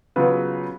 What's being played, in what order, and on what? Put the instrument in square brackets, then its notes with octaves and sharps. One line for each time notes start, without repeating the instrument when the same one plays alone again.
[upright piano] C#3 F#3 B3 F4 B4